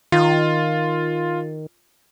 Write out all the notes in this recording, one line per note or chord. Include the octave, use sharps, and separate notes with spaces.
D#3 F4